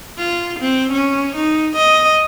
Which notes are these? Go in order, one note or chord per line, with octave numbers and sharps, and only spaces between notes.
F4
C4
C#4
D#4
D#5